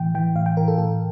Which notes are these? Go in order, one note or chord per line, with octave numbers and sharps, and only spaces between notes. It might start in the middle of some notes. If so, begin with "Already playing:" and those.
Already playing: A2 E3 G5
E3 G5
A2 F5
G5
E3 A#4
A4
A2 A4